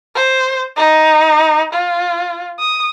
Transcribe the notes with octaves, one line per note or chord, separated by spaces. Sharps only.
C5
D#4
F4
D#6